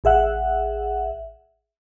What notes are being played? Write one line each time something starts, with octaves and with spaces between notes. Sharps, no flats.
A1 G#4 E5 F#5